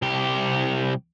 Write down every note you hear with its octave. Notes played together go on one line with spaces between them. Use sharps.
C2 G4